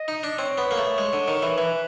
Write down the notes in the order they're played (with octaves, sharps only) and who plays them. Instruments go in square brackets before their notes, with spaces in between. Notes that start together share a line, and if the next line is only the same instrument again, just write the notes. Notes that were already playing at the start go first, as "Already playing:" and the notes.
Already playing: [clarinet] D#5
[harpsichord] D#4
D4
[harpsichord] C4 [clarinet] C#5
[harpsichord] B3
A#3
A3
G#3
D3
D#3
E3
[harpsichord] E3 [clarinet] B4